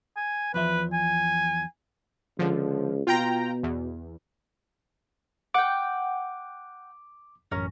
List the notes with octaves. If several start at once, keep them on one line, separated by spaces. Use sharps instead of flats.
G#5
E2 F3 B4 E5
G#5
C#2 D3 F3
B2 F4 G5 A#5
E2
F#5 G5 D6
A1 F#2 C#4 A#4